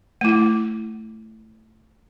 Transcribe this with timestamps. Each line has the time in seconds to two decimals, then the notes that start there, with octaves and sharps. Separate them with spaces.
0.21 A3 E4